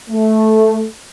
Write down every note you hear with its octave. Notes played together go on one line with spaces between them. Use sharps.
A3